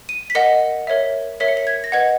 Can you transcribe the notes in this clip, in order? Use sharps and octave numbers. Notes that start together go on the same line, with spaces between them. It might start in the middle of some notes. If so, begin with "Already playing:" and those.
D#7
B6
A#4 D#5 F#5 C#7
A#4 C#5 E5
A#4 C#5 E5 B6
C#7
B6
G#6
A#6
B4 D#5 F#5 G#6